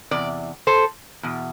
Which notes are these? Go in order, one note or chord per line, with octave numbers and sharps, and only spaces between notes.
E2 C3 D5
A4 C5
E2 B2